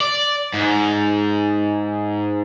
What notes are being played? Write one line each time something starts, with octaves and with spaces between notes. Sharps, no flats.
D5
G#2